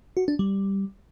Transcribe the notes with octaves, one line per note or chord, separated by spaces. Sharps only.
F#4
D4
G3